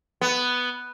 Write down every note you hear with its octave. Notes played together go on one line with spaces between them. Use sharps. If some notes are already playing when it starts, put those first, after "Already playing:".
B3